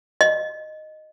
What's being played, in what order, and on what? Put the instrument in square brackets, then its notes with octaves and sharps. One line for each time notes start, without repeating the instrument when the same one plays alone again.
[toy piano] D#5